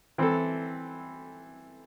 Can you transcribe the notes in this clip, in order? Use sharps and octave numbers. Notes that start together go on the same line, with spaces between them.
E3 C4 E4 A4